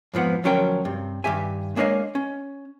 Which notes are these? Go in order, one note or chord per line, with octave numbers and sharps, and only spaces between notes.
F2 G#2 F3 B3 F#5
D2 F3 F#3 C#4 A#4 G5
G2 C3
G2 D#3 G4 E5 G#5
G#3 A#3 D4 C#5 D#5 F5
C#4